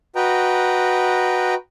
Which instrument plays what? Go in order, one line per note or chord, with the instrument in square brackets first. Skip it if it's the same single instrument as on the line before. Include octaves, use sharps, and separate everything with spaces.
[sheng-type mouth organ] F#4 B4 D#5 G5 A#5